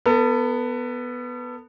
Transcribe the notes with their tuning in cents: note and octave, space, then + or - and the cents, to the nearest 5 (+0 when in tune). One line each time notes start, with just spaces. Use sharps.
B3 +0 A4 +35